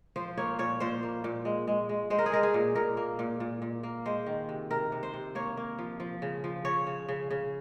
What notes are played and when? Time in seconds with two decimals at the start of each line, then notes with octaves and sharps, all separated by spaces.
0.16 F3 C5
0.38 A#3 C#5
0.59 A#2 C#5
0.80 A#2 C5
1.03 A#3
1.24 A#2
1.45 G#3
1.67 G#3
1.89 G#3
2.10 G#3 C5
2.18 A#4
2.26 G#4
2.32 G#3 A#4
2.43 G#4
2.54 A#2
2.75 A#2 A#4
2.97 A#3
3.19 A#2
3.40 A#2
3.62 A#2
3.83 A#3
4.06 G#3 C5
4.26 D#3
4.49 C3
4.70 C3 A#4
4.92 C3
5.03 C5
5.14 C3
5.35 A#3 C#5
5.57 A#3
5.79 F3
6.00 F3
6.22 C#3
6.44 F3
6.65 C#3 C#5
6.87 C#3
7.09 C#3
7.31 C#3